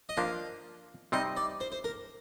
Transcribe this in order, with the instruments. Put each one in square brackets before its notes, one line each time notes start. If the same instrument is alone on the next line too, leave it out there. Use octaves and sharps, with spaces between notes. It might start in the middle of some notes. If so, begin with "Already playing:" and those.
[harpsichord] D#5
[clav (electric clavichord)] F3 A#3 D4 [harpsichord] F5
[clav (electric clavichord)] C3 G3 C4 D#4 [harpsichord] D#5
[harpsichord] D5
C5
C5
A#4